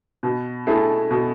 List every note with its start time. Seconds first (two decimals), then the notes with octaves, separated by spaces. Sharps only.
0.23 B2
0.67 A3 E4 G#4
1.11 B2